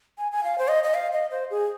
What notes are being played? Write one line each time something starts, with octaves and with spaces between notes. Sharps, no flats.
G#5
G#5
F5
C5
D#5
D#5
F5
D#5
C5
G#4